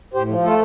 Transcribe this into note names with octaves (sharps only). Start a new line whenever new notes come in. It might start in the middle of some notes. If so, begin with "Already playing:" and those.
A2 G4 C5
F3
A3 F4 A4